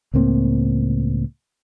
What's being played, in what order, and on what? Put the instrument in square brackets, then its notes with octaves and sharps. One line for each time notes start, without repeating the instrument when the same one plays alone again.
[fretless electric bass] C#2 A2 A#3 C4